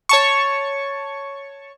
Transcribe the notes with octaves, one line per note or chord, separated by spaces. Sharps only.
C#5 A5 C#6